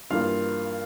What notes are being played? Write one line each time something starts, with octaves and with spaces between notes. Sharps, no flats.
G2 E3 A#3 F4 F5